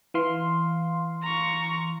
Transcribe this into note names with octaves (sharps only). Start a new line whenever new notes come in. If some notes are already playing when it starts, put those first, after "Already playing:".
E3 F5 C6
A#5 C#6